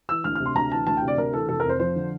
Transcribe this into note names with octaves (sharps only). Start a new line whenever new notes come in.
E3 E6
D2 F6
F6
C3
C6
D2 A#5
E3 A5
D2 A5
G5
C3
D5
D2 A#4
E3 A4
F1 A4
A#4
F2 C5
F3 C5
D3